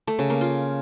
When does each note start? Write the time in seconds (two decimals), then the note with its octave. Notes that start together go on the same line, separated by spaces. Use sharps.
0.07 A3
0.19 C#3
0.30 A#3
0.41 F4